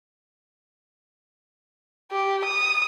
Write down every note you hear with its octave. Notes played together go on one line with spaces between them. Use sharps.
G4
D#6